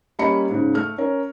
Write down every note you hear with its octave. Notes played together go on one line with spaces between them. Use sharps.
G3 A#3 C#4 D#5 B5 C#7
G#2 C#3
A3 F6
C#4 A#4 C#5